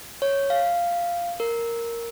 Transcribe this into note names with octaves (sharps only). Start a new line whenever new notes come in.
C#5
F5
A#4